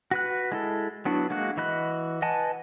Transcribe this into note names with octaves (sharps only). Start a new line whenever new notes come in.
F#4 B4 F#6
G#3 E4 A4
F#3 B3 D4 E4 F#4
G#3 A#3 F#4 F#6
E3 F#4 D#5 B5 F#6
B4 D#5 F#5 G#5 A5